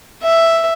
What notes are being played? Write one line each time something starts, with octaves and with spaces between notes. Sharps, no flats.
E5